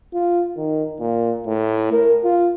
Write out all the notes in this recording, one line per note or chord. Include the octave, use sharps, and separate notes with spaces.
F4
D#3
A#2
A2
A#4
F4